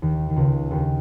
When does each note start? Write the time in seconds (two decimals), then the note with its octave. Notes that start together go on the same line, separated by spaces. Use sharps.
0.02 D#2 D#3
0.30 D#3
0.36 C#2 C#3
0.71 D#2 D#3